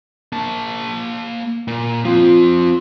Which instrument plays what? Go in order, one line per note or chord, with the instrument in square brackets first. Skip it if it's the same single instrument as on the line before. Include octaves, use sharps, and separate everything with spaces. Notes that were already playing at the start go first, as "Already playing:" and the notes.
[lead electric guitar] A#3 A5
A#2
[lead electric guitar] F3 C4 [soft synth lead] F4